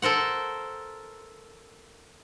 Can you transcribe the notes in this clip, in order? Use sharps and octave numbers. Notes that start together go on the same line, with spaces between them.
A4 A#4 C5 F#5